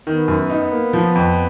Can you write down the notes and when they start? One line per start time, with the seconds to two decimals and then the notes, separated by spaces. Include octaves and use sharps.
0.06 D#3 B3
0.28 F#2
0.50 D#4
0.72 A#3
0.93 F3
1.15 F2